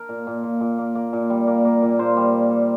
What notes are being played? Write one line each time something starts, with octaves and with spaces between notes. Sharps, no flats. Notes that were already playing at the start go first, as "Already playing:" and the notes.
Already playing: A#4
A#2
A#2
A#2
A#2
A#3
A#3
A#2
G3
A#3
A#3
A#2
A#2 C5
G3
A#3
G3